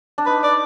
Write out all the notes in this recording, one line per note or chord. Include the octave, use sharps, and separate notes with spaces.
D4
D#4 B4
D5